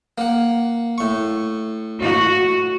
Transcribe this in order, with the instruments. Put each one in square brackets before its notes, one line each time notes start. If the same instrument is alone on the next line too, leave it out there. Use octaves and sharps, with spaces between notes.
[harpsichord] A#3 F#5
A2 C#6
[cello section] F#4